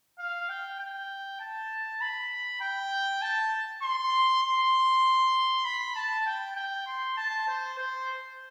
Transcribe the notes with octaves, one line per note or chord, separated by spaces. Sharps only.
F5
G5
G5
A5
B5
G5
A5
C6
C6
B5
A5
G5
G5
C6
A5
C5
C5